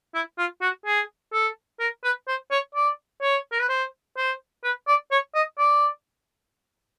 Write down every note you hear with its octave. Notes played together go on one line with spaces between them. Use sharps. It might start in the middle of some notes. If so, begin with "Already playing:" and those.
E4
F4
F#4
G#4
A4
A#4
B4
C5
C#5
D5
C#5
A#4
B4
C5
C5
B4
D5
C#5
D#5
D5